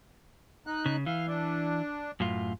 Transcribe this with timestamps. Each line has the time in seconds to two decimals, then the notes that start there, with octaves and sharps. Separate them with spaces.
0.67 D#4 F#6
0.86 C#3
1.06 E3 F5
1.27 D4
2.20 F#2 A2 F4